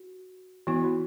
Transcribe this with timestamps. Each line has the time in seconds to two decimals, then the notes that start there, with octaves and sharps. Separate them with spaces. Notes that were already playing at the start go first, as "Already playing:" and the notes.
Already playing: F#4
0.67 E3 B3 E4 F#4
0.84 F#4